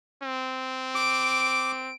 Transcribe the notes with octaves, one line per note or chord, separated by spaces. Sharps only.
C4
D6 D7